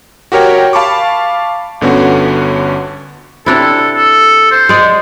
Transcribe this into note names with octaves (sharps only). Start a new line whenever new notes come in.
F#4 G4 A#4 C#5 G5
F5 A5 B5 C#6 D6
G1 D3 B3 C#4 F#4
C3 D4 E4 A4
A4
C5
G#3 D5